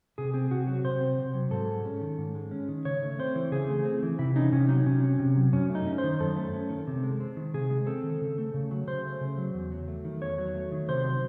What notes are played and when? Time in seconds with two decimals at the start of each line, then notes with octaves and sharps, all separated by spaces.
0.18 C3 G#4
0.34 C4 G#4
0.51 C3 F#4
0.67 F#3 F#4
0.84 C3 C5
1.01 C4
1.19 C3
1.34 F#3
1.51 G#2 A4
1.68 G#3
1.85 C#4
2.02 D#3
2.18 G#2
2.35 G#3
2.51 C#4
2.68 D#3
2.85 C#3 C#5
3.02 A3
3.19 C4 C5
3.35 E3
3.52 C#3 G#4
3.69 A3
3.85 C4
4.03 E3
4.19 C3 E4
4.36 C#4 D#4
4.52 C3 C#4
4.69 F#3 D#4
4.86 C3 C#4
5.03 C#4
5.19 C3
5.37 F#3
5.53 F#2 C#4
5.70 A3
5.75 D#4
5.87 C#4
5.98 C5
6.04 D#3
6.20 F#2 A4
6.36 A3
6.54 C#4
6.70 D#3
6.87 C3
7.04 G#3
7.20 C4
7.37 D#3
7.54 C3 G#4
7.70 G#3
7.87 C4 A4
8.03 D#3
8.21 C#3
8.38 A3
8.54 C#3
8.71 F#3
8.87 C#3 C5
9.05 A3
9.21 C#3
9.38 F#3
9.54 E2
9.72 F#3
9.88 A3
10.05 D#3
10.22 E2 C#5
10.38 F#3
10.55 A3
10.72 D#3
10.88 C3 C5
11.05 F#3